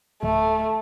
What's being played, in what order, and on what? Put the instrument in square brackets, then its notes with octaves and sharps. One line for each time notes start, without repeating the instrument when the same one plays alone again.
[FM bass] D1 [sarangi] A3